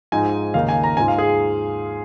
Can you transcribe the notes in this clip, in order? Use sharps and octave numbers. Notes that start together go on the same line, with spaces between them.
G#2 F3 G#3 D#4 G#5
D#2 C#3 A#3 D#4 F5
G#5
A#5
G#2 G#3 F4 G#5
F5
G#4